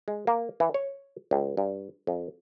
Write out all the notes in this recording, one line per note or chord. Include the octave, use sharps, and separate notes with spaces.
G#3
A#3
E3
C#5
C#2
G2
F2